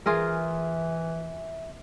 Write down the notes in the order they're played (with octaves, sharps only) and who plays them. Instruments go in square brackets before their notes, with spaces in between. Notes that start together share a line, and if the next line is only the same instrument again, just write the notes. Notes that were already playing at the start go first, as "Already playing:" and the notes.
[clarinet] E3 [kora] F4 G#4 A#4 [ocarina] E5